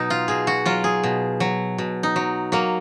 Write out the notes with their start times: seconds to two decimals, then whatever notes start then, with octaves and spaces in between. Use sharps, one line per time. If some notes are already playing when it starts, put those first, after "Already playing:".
Already playing: B2 F#3 D#4
0.10 F4
0.28 B2 G#4
0.47 F#4
0.66 F#3 F4
0.84 G#4
1.04 B2
1.40 F#3
1.78 B2
2.03 D#4
2.16 F#3
2.52 F#3 A#3